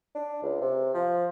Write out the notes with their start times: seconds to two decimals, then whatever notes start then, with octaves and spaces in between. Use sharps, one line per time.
0.15 D4
0.42 C#2
0.61 C3
0.94 F3